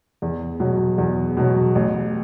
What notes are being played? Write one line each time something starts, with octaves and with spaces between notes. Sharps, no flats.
E2
B2 F#3
E2
B2 F#3
A1